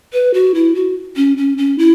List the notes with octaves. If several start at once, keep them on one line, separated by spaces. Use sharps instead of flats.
B4
F#4
E4
F#4
C#4
C#4
C#4
E4